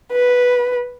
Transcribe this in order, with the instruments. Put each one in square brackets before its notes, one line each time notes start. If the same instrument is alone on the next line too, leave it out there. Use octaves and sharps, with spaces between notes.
[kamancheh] B4